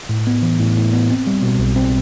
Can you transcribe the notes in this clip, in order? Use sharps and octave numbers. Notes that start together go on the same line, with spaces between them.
A2
B3
E3
A2
A2
B3
C4
G3
B2
B1
C4